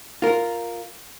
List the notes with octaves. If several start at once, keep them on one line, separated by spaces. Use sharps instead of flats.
F4 A#4